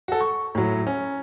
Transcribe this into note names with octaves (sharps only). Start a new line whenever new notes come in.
F#4 A4
C#6
A2 F#3
C#4